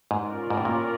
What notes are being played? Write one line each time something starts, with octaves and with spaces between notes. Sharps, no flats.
G#2
C#4 F4 A#4 D5
G#2
A2
A#2